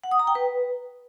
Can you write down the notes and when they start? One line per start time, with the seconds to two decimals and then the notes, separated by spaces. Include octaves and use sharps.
0.04 F#5
0.11 D#6
0.19 A#5
0.27 G5
0.35 B4